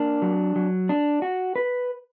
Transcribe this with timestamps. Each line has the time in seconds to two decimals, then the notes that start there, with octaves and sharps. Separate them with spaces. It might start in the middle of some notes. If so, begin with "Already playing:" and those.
Already playing: A#3 D4
0.22 F#3
0.56 F#3
0.89 D4
1.22 F#4
1.56 B4